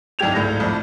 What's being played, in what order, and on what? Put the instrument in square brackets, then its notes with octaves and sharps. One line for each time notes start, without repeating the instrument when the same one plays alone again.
[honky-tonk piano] C2 F#2 D#3 G4 G#6 F7
G#1 C#2 A2 G6 A#6
C2 F2 A2